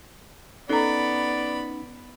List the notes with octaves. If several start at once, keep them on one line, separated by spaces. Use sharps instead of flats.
B3 C#4 D#4 A4 D5 A#5 B5